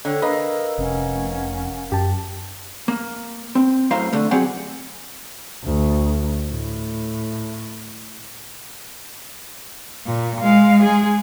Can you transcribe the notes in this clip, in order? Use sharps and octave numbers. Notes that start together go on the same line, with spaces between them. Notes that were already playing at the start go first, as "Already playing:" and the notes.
D3 C#5 D5 G5
A#3 B4 D#5 D#6 E6
F1 C#4 F#5
F#2 G4 A5
A#3
C4
F#2 A2 C5 F5 A#5
D3 A3
F#3 C4 G4 G#4 F#5
D2
A2
A#2
G#3 F5
G#3 G#4